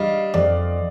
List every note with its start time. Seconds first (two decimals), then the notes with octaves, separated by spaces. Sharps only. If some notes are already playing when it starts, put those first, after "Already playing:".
Already playing: G3 D4 D#5 F5
0.34 F2 D5